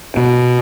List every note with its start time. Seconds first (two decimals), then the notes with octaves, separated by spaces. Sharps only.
0.17 B2